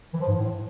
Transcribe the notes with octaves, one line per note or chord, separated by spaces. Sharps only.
E3
F3
G#2
A2